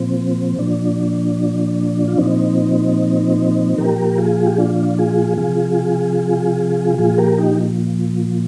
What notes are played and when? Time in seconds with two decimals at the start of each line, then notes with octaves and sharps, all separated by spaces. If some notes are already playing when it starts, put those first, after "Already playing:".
Already playing: A#2 F3 C4
0.58 A#2 F3 D4
2.08 F4
2.18 A#2 F3 C4 D#4
3.78 A#2 F3 G4 A#4
4.18 F4 G#4
4.46 G4
4.58 D4 F4
4.98 F4 G#4
5.38 C3 F3 F4 G#4
6.98 A#2 F3 F4 G#4
7.18 G4 A#4
7.37 D#4 G4